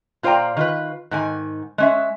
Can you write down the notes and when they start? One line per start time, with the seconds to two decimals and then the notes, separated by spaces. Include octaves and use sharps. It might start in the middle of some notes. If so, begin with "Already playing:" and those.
0.23 A#2 F4 C5 D5 G5 A#5
0.57 D#3 F4 B4
1.11 G#2 D#3 G#5
1.78 G#3 C#4 E5